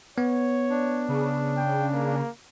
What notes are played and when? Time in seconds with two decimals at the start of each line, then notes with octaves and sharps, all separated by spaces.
0.18 B3 C#5
0.70 D4
1.09 C#3
1.57 G5
1.93 A#3